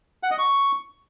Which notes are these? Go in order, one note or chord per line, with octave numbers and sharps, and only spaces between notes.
F#5
D#5
C#6